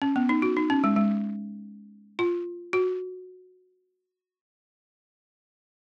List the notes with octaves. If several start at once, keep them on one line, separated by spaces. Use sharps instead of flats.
C#4
B3
D#4
F#4
D#4
C#4
G#3
G#3
F4
F#4